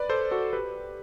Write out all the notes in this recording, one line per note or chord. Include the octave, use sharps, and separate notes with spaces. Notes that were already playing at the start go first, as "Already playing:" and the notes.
Already playing: B4 D5
A4 C5
F#4 A4
G4 B4